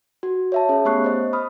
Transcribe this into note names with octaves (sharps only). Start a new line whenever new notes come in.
F#4
C#5 E5 A5
C#4 G#4 C#5
A3 B3 G4 C#6 F#6 C7
C5 D#5
B5 D#6 F6